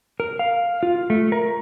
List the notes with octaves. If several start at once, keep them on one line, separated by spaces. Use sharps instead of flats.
A#4
F5
F4
A3
A#4